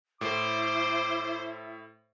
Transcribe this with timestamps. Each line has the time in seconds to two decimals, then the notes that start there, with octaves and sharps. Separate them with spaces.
0.21 A2 E4 C5 D6